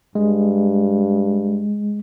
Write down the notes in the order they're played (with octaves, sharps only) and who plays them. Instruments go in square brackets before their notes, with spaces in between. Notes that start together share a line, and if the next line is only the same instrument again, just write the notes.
[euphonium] G2 [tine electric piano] G#3